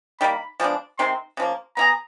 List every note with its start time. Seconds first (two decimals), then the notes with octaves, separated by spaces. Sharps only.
0.20 D#3 G3 A#3 B5
0.60 F3 G#3 B3 D4
0.98 C3 D#3 G#3 C4 C6
1.37 C#3 F3 A#3
1.77 B3 E4 G#4 A#5